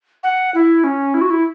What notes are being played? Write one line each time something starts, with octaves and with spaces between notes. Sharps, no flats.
F#5
E4
C#4
E4
F#4
E4